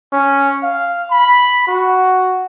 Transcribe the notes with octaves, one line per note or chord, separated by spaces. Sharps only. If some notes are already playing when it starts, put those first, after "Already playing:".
C#4
F5
B5
F#4